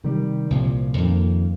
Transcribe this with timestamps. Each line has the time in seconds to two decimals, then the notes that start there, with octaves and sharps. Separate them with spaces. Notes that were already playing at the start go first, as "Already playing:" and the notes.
0.04 C3 D#3 G3
0.50 C2 A#2 F3
0.98 F2 D#3 A#3